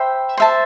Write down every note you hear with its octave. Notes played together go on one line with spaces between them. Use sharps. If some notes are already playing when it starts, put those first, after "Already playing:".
Already playing: C5 E5 G5 B5
C5 E5 A5